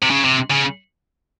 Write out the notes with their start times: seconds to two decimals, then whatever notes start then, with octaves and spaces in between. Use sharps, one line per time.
0.03 C3
0.10 C#3
0.24 C3
0.50 C#3